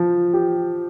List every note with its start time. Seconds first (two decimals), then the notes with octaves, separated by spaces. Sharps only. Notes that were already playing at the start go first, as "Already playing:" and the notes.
Already playing: F3
0.34 G4